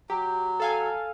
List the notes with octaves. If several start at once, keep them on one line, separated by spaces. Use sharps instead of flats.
F#3 G4
A4 F5 G#5